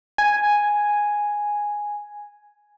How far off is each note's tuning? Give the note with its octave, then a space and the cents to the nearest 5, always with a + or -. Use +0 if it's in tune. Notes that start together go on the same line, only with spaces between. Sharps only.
G#5 +0